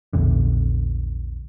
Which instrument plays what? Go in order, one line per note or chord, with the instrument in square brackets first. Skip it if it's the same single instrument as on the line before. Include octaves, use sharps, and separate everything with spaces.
[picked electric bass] A#1 E2 D3